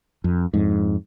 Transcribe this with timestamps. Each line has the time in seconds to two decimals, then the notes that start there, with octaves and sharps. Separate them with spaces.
0.24 F2
0.54 F2 G#2